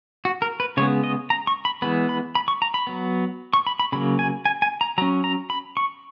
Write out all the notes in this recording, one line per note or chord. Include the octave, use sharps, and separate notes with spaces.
F#4
A#4
B4
C#3 G#3 B3 C#5
D#5
A#5
C#6
B5
E3 G#3 B3 B5
B5
B5
C#6
A#5
B5
F#3 B3
C#6
B5
B5
C#3 F#3 A#3 B5
G#5
G#5
G#5
A#5
F#3 C#4 A#5
A#5
B5
C#6